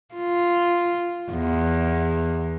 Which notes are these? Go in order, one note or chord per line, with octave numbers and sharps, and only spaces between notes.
F4
E2